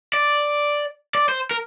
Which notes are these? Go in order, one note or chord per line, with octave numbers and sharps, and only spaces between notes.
D5
D5
C5
A#4